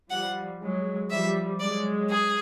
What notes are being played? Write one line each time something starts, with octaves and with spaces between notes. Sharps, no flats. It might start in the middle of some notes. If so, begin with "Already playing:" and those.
F3 G3 F#5
F#3 G#3
F3 G3 E5
F#3 G#3 D5
G#4